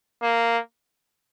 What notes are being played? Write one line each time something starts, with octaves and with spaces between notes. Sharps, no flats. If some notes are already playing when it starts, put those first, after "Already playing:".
A#3